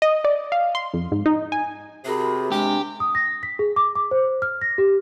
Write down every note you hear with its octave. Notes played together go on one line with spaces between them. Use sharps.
D#5
D5
F5
C6
F2
G#2
D#4
G#5
C3 F#4 G#4 A#4 B5
G#3 D4 G4 G#5
D#6
A#6
B6
G#4
D6
D6
C5
F6
A#6
G4